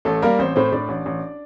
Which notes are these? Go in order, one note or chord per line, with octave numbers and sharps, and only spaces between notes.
A1 A3 A4
G3 A#3 A#4
A1 C4 C5
A2 C4 C5
A2 D4 D5
A1
A1